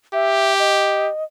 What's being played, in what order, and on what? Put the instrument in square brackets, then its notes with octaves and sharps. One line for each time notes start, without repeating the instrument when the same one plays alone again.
[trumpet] G4 [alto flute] E5
[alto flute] D#5